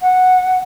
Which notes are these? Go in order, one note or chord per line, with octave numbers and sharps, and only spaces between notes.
F#5